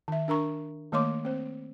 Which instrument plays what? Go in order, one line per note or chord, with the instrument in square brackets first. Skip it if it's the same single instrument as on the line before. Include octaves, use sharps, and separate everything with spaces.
[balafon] D#3 E5
D4 A#4 A#5 C#6
D#3 A3 A#3 C#5 C6 D6
C4 C5